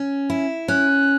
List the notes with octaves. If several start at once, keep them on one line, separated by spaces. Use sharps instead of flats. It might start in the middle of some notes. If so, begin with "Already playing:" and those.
Already playing: C#4
E4
C#4 F#6